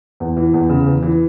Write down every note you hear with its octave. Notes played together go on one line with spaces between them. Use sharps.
E2
E3
E2
C#3
E2
E3